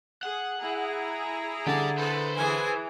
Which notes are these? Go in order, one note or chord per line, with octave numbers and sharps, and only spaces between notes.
G#4 F#5
E4 G#4 A#5
D3 G4 D5 A5
A4 B4 C5
E3 G#4 G#5